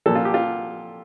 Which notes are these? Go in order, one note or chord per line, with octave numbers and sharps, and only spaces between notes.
A#2 F3 A4
F4
G4
F4